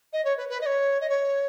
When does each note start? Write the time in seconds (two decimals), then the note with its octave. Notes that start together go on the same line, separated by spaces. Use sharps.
0.13 D#5
0.24 C#5
0.37 B4
0.49 B4
0.61 D#5
0.66 C#5
1.00 D#5
1.09 C#5